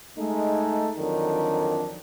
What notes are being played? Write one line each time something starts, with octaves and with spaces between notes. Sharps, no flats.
G#3 A3 D#4
F2 D3 D#3 F#3 D4